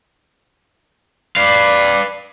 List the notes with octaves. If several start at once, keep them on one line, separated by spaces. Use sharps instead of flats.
B4 D5 F5